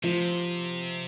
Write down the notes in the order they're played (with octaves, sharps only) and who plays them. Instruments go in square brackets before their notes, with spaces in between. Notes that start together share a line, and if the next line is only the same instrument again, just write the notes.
[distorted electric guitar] C3 [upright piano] F3